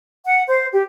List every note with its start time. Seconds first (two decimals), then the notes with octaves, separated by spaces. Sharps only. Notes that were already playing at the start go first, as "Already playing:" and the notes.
0.25 F#5
0.47 C5
0.72 G4